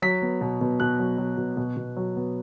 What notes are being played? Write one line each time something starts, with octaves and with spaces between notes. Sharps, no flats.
F#3 B6
B3
B2
B2
B2 F#6
F#3
F#3
B2
B2
B2
F#3
B3